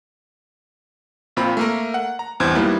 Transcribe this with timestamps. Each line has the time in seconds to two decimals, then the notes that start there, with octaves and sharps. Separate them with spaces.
1.36 A#1 A#2 C4 F4 B5
1.57 A3 A#3 A#4
1.94 F#5
2.19 A#5
2.40 A1 E2 G2 C4 C5 G#6
2.55 D#3 F#3 G3 A#3 B3 E4